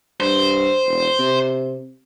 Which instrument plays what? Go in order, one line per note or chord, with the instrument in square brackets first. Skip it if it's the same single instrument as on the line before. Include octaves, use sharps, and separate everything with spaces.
[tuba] G2 [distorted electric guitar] C5
[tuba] E1
C3